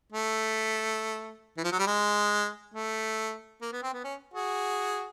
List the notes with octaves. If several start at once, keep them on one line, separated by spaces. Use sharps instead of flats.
A3
E3
F3
F#3
G3
G#3
A3
A#3
B3
C4
B3
C#4
F#4 G#4